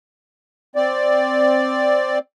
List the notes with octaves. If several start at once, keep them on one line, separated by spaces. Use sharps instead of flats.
C4 D5